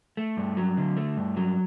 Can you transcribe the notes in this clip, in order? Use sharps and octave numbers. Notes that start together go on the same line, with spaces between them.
A3
G2
F#3
D3
A3
G2
F#3